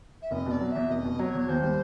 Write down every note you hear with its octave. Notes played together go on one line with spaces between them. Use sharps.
E5
F1 D#5
B2 D5
F#3
E2 E5
F1 D#5
B2
F#3 C#5
E2
D#2 C5
G3